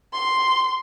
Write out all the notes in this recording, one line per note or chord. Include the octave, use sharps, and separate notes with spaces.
C6